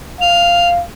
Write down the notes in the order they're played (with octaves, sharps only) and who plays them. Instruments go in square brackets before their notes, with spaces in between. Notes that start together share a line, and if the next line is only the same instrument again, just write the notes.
[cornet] F5 [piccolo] F7